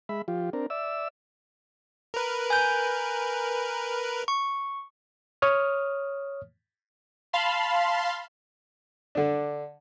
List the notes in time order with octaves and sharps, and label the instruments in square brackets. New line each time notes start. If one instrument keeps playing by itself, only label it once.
[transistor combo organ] G#3 E5 B5
F3 F4 G4
C4 D4 A#4
D5 E5 E6
[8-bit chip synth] A#4 B4
[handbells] G#5 G6
C#6
[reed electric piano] C#5 D#6 F6
[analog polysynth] F5 A5 B5 C6
[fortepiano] D3 D4